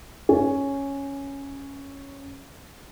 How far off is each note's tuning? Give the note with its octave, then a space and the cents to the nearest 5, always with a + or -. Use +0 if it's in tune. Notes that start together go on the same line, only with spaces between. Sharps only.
C#4 +0